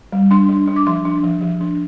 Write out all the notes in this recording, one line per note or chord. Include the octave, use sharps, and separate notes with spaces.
G3
D4 C6
D4
D4
D6
F3 C6
D4
F3
F3
D4